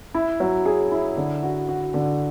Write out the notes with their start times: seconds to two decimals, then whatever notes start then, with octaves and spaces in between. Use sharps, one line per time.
0.15 E4
0.40 F#3
0.66 G#4
0.92 E4
1.17 D3
1.43 F#4
1.69 F#4
1.94 D3